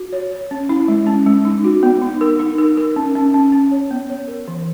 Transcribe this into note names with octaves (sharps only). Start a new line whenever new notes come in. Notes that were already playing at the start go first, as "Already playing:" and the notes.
Already playing: F#4
C#5
C#5
C#4
E4
G#3
C#4
G#3
D#4
F#4
B3
D#4
A#4
D#4
A#4
A#4
C#4
C#4
C#4
C#4
C#5
B3
C#5
A#4
E3